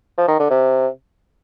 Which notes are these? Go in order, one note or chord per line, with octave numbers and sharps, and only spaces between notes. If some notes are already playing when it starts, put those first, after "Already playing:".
F3
D#3
D3
C3